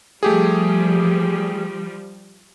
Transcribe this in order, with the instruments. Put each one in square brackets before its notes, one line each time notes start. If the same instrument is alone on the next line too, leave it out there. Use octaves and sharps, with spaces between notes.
[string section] F3 G3 [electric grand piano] A3 G4 G#4